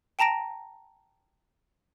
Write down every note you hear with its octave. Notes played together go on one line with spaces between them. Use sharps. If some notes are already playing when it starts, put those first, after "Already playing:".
G5 A5 A#5 A#6 D7